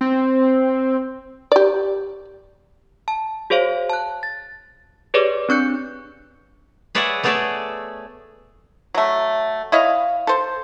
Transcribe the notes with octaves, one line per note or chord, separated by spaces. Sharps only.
C4
G4 D5
A5
F#4 G#4 C5 C#5 F5
A5 F#6
A6
G4 G#4 B4 C#5 D5 D6
C4 D4 C#6 F#6 G6 C#7
G#4 B4 C#5 D5 E5 F#5
A3 B3 G#4 C#5 D5 E5
F#3 A3
E4 C#5 D#5 F5
A4 C5